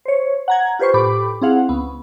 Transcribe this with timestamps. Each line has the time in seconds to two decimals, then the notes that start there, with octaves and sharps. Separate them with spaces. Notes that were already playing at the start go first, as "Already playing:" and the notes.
0.05 C5 C#5
0.48 F#5 A#5 G#6
0.79 F4 G4 B4 C5 C#6
0.94 A2 G4 B5 D6
1.41 C4 E4 G#4 F5 F#5
1.69 C#2 B3